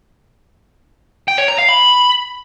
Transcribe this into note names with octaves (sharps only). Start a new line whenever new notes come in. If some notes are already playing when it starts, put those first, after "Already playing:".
G5
C#5
A#5
F5
B5